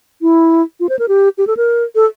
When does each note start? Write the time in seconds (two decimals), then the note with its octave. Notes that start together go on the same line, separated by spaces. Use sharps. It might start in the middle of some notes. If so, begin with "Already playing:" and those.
0.22 E4
0.80 F4
0.89 C5
0.99 A#4
1.09 G4
1.38 G4
1.47 A4
1.57 A#4
1.95 A4